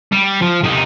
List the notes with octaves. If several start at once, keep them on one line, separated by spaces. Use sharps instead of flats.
G3
F3
C3 D#4